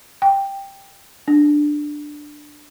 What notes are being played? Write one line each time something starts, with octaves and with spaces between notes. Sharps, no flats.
G5
D4